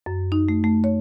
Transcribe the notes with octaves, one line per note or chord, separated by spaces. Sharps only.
F#2
D#4
A3
A3
C#5